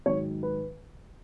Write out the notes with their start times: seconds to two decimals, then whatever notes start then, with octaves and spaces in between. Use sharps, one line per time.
0.06 G#2 D#3 F#3 C#5
0.43 B4